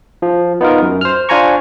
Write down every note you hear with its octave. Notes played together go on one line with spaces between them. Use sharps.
F3
B3 D#4 F4 A#4
F#2
C5 F6
D4 F4 C5 G#5 A#5 C#6